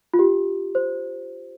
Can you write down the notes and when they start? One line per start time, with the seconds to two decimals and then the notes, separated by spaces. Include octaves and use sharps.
0.14 F4
0.19 G4
0.75 C5